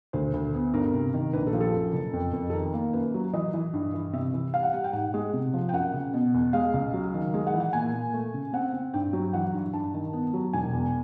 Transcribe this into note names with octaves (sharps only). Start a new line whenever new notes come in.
D2 C5
D2
B3
G2 A#4
C3
D#3
A#1 B4
A4
F3
A4
F#2
F#1
F2
F2
A4
D#3 A#4
A#3
F#2 B4
F#3
E3 D#5
E3
G2
E3
C3 E5
E3
G3 F5
F#5
G3 F#5
G5
G#2 F#5
G#3
C3
F3
G5
F#2 F#5
C#3
B2
E2
G#3 F5
C#2
F#3
D#3
G#3
F#5
E3
F#5
A#2 G#5
A#2
A3
C#3
C4 F#5
C4
G2 G5
F#3
E3 F#5
G2
G2 A5
D#3
B3
F#3
E1 G#5
E2